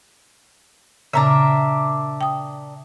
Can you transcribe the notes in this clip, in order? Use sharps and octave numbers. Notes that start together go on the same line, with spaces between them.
A#2 C#3 D4 A#4 E5
G5 D#6